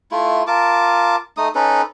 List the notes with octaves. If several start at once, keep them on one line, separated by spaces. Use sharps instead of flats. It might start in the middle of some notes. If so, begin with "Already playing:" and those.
A3 E4 F4
F4 A#4 A5 D6
A3 D#4 D#6
C#4 D#4 A4 B4